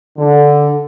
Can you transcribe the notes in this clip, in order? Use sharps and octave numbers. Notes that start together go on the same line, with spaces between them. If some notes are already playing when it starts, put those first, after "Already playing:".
D3